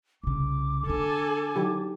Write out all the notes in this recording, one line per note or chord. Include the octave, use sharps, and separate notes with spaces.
C2 C#3 D6
D3 D4 A4 G#5
D#3 F#3 G4